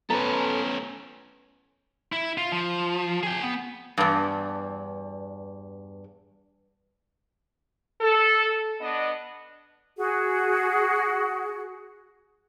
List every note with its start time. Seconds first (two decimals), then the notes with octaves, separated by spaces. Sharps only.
0.10 B3 C#4 A4 B4 A#5
2.12 E4
2.38 F4
2.52 F3
3.23 G#4 G5
3.42 B3
3.98 E2 G2
8.01 A4
8.81 B3 D4 D#5
9.97 F#4 G#4